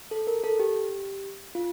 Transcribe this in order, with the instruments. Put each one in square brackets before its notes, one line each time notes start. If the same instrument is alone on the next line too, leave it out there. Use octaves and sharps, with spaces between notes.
[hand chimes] A4
A#4
A4
G4
F4